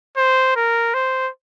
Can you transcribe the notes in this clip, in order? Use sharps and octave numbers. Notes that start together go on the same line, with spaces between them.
C5
A#4
C5